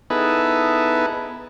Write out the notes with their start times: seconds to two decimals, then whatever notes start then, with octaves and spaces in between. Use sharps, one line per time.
0.10 B3 D#4 E4 G#4 A4 B4